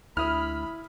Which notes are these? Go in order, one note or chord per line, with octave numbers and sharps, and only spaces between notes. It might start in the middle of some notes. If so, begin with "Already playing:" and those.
D2 E4 B5 D#6 F6